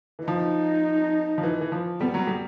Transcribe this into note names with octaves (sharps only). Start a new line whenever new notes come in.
E3
F3 D#4
F3
E3
E3
F3
G3 B3
F#3
G3